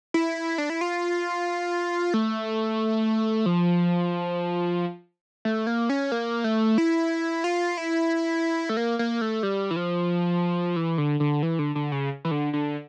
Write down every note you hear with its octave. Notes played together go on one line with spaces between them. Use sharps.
E4
D4
E4
F4
A3
F3
A3
A#3
C#4
A#3
A3
E4
F4
E4
A3
A#3
A#3
A3
G3
E3
F3
E3
D3
D3
E3
D3
D3
C#3
E3
D3
D3